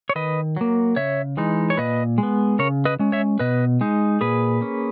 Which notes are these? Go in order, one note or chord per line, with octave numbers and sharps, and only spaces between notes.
C#5
D#3 B4 D#5
F#3 A#3
C#3 C#5 E5
E3 G#3 D#4
C#5
A#2 B4 D#5
G#3
B3
C#3 A#4 C#5
B4 D#5
G#3 C#4
C#5 E5
B2 B4 D#5
G#3 D#4
A#2 G#4 B4
A#3 C#4